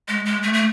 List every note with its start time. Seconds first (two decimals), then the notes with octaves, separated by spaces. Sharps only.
0.08 G#3
0.25 G#3
0.43 A3
0.53 A3